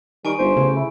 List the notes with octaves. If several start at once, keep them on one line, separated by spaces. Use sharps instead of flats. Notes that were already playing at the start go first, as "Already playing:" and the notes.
D#3 G3 G#5 C#6 D7
G1 C5
A1 C#3
E4